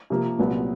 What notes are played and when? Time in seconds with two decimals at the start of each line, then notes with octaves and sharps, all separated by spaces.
0.10 C3 F3 A#3
0.39 C2 A#2 F#3 B3